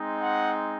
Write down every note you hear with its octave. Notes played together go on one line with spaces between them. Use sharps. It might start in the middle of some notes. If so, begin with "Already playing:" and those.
Already playing: G#3 C4 D#4
F#5